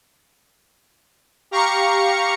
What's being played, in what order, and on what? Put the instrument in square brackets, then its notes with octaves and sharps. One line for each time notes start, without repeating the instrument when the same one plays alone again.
[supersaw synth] G4 F5 A#5 C#6 C#7